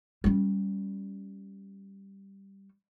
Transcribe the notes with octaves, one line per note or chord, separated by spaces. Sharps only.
G3 C#4